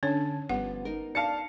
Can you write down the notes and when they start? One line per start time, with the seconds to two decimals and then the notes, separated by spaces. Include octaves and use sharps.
0.03 D3 C#4 D4 C#5 A5
0.49 G1 F3 G3 B3 F#5
0.85 D#4 A#4
1.15 D5 F5 A5 C#7